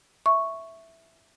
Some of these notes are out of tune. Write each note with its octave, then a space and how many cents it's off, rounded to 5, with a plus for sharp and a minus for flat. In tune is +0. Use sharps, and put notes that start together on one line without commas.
E5 +0 C#6 +0